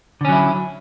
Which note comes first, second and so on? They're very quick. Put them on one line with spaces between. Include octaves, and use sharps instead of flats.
D3 C#4 F#3 E4